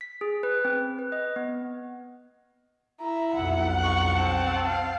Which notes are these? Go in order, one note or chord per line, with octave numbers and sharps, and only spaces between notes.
B6
G#4
B4
C4
B4
D#5
B3
E4 E5 A#5
B1 F2 F#5
C#6 F#6
C4 A5
F5